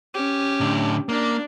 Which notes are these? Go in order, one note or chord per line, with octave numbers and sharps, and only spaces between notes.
C#4 G4
A2 D3
A#3 D4